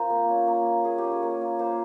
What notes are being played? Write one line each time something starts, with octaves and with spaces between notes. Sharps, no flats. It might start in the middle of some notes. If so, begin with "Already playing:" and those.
Already playing: C4 F4 A#4 C5
A#3
C#4
A#3 A#4
F4
A#3 G#4
G4
C#4
G#4
A#3
F4
A#3 C5